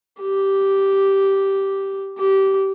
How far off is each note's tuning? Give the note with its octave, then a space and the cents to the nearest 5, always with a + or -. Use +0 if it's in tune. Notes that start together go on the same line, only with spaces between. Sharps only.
G4 -5
G4 -20